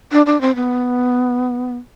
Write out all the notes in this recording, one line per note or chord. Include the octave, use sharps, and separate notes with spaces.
D4
D4
C4
B3